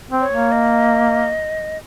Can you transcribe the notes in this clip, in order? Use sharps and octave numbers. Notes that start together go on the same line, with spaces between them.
C4
C#5
A#3
D#5